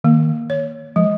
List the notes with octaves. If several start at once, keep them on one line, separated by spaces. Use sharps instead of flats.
D#3 A#3
C#5
F3 G#3